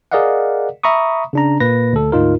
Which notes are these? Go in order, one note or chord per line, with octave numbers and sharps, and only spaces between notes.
G#4 A#4 D5 D#5 F5 F#5
E5 A#5 B5 C#6 D#6
C#3 D4 A#5
A#2 A#3 B4 A#6
D2 A4
D2 G#2 D#4 F4 A#4